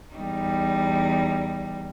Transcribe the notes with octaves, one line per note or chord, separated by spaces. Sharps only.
E2 G3 D#4